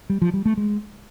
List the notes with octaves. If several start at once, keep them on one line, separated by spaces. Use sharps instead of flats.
G3
F3
G3
A3
G#3